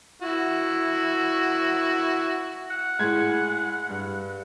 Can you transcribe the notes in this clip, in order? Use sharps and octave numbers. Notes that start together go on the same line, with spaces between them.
E4 F#4
F#5
A2 G#3 G#6
G2